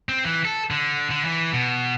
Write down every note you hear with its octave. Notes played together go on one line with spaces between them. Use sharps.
C4
E3
A4
D3
D3
E3
B2